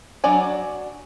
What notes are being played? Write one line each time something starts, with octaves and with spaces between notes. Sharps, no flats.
F#3 D4 D5 G#5